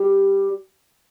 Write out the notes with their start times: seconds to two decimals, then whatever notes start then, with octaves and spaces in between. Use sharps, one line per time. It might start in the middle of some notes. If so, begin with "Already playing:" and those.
Already playing: G3 G4